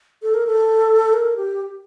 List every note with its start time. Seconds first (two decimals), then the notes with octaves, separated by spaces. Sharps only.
0.23 A4
0.34 A#4
0.47 A4
1.13 A#4
1.37 G4